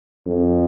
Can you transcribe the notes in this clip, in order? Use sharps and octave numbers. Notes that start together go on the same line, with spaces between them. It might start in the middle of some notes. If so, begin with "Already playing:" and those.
F2